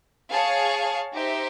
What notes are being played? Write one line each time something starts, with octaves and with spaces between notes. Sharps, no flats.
G#4 C#5 F5 A5
D#4 G4 C5 E5